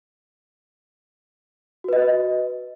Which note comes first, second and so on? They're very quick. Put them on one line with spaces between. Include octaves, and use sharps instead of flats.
F#4 B4 D#5